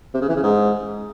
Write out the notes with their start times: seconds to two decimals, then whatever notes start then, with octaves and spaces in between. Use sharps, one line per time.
0.14 C3
0.21 C#3
0.28 E3
0.36 C#3
0.43 G#2